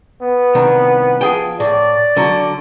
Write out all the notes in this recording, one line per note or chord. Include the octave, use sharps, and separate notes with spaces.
B3
C2 D#3
F3 G#4 G5
A2 D5
D3 F#3